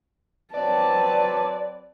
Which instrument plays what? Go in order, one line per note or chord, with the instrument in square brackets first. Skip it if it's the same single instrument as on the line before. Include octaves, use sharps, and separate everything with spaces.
[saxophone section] F#3 B4 [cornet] C4 [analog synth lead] D5 [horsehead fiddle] A5